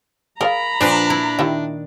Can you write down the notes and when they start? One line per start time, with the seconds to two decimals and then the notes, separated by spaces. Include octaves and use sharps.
0.41 G#4 A#4 D5 F5 A#5 B5
0.81 A#2 F3 D4 B4
1.10 E4
1.39 D#3 E4 G4 E5